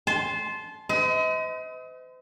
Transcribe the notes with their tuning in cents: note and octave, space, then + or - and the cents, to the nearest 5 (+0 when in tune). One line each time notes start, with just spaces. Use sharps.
A5 -25 C6 +0
C5 -45 D#5 +35